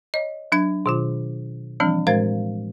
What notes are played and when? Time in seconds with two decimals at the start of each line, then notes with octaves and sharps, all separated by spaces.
0.14 C#5 D#5
0.52 F#3 D4 G#6
0.86 B2 D#3 F4
1.80 E3 F3 G3 C4 D4
2.07 A2 G#3 A#4 C5 F5